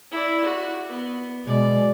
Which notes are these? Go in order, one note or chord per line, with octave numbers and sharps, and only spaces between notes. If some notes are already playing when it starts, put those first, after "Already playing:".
E4 D5
F#4
B3
B2 G#3 D5